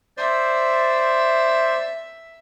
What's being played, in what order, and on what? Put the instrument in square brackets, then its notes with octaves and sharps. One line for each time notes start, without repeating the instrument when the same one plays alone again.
[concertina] C5 D5 [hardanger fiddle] E5